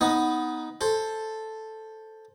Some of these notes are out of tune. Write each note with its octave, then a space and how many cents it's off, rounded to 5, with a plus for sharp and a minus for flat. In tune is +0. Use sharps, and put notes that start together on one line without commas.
B3 +0 D#4 +10
A4 +0 C5 +10